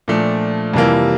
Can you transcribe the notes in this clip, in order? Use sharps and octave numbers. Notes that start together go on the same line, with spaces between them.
A#2 F3 A3 D4
F2 C3 E3 G3 A#3